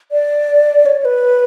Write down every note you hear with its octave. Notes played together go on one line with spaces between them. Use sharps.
D5
C#5
B4